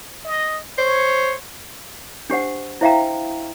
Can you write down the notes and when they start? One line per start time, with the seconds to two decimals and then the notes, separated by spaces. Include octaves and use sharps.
0.24 D#5
0.78 C5 C#5
2.30 D4 G4 C5 F#5
2.81 E4 C5 E5 F5 G5 A#5